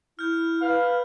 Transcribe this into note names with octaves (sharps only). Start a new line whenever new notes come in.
E4 F6 G6
B4 F5